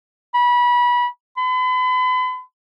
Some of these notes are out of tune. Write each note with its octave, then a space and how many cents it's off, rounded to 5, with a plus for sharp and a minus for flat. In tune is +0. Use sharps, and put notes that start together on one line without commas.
B5 -25
B5 +40